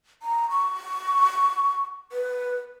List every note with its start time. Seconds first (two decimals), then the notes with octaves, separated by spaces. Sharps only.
0.22 A#5
0.50 C#6
2.12 B4